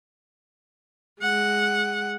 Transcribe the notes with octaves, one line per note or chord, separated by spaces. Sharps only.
G#3 F#5